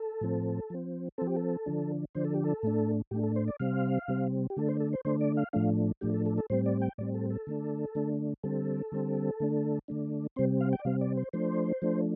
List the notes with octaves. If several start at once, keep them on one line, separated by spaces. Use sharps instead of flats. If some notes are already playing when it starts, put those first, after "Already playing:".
Already playing: A4
A2 F3 C4
F3 C4
F3 C4 A4
G4
A4
D3 F3 D4
D3 F3 D4 C5
A4
G4
A4
A2 A3 D4
A2 A3 D4 G4
A4
C5
D5
C3 G3 C4 F5
C3 G3 C4
G4
D3 A3 D4 A4
C5
A4
C5
D3 A3 D4 C5
D5
F5
A2 F3 A3 D4 F5
A2 F3 A3 D4 G4
A4
A4
A4
A2 G3 C4 C5
D5
G5
A2 G3 C4 D5
A4
A4
D3 A3 D4
D3 A3 D4
D3 G3 C4 A4
D3 G3 C4
D3 A3 D4
D3 A3 D4
C3 G3 C4 C5
F5
G5
D5
C3 G3 C4 F5
D5
C5
F3 A3 D4 C5
F3 A3 D4